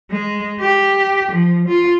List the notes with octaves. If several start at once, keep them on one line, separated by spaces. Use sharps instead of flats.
G#3
G4
F3
F4